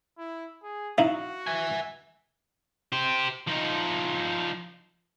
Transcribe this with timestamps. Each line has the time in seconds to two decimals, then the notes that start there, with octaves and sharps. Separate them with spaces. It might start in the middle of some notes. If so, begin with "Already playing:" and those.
0.18 E4
0.63 G#4
0.98 D#4 E4 F#4 F5
1.47 E5 G#5
2.92 G4 C5
3.47 F3 D#4